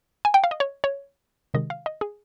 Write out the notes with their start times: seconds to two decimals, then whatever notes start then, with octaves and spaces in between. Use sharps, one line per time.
0.25 G#5
0.34 G5
0.44 F5
0.51 D#5
0.60 C#5
0.84 C#5
1.54 C3 D#3 G#3 D#5
1.70 F5
1.86 D#5
2.01 G#4